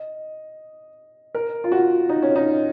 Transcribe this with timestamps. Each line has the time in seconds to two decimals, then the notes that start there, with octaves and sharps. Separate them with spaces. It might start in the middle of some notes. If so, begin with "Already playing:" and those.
Already playing: D#5
1.35 A#4
1.64 F4
1.72 F#4
2.09 D#4
2.22 C#4
2.36 D#4